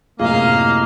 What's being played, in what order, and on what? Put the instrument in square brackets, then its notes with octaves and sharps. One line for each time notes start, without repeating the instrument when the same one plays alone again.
[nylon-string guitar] F#2 A2 C3 [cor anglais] A#3 [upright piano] F4 G#4 [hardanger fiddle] D#5 F5